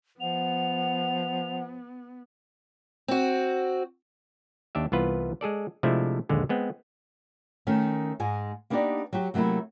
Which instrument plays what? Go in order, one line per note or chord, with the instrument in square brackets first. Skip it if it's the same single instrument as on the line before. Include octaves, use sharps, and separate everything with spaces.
[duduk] F3 [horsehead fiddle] B3 [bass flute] F#5 [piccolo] F7
[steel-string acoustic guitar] C4 F#4
[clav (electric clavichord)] D#2 D4 G4 E5
C2 E3 B3 F4 B4
G#3 G#4 A4 D5
C3 F3 G#3 A3 D4 E4
A#1 D#2 D3 G#3
G#3 B3 C4
[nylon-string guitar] D#3 A3 C#4
G#2 G#3 G#5
A#3 B3 D4 D#4 G4 D5
F#3 F#4 G4
C3 F#3 A3 A#3 E4